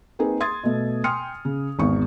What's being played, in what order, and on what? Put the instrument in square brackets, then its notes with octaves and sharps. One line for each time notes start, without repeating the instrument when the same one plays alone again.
[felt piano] A#3 C4 D#4 G#4 B4
C6 D#6 G#6 A6
B2 A3
G5 G#5 C6 D#6 F6 C#7
C#3
G#1 E2 C#6